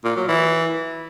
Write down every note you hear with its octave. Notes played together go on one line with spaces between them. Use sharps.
A#2
F#3
E3